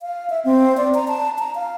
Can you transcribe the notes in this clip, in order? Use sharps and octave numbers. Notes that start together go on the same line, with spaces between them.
F5
E5
C4
D5
A#5
A5
A#5
F5